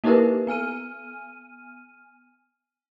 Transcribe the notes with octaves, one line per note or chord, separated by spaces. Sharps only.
A#3 D#4 E4 G4 A#4 B4
B3 G#5 F6 D#7